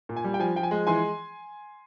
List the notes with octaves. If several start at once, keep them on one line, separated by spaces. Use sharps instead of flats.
A#2
G#5
G3
G5
F3 G#5
F3 G5
G#5
G#3
E3 G#5 C6